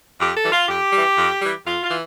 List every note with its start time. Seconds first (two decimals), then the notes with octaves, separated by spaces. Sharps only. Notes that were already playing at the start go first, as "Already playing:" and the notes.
0.19 F2 G4
0.36 A4
0.44 E3 G3
0.52 F4
0.68 F2 G4
0.92 E3 G3
1.18 F2
1.41 E3 G3
1.66 F2 F4
1.83 F4
1.91 E3